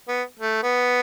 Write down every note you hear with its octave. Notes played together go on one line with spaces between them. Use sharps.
B3
A3
B3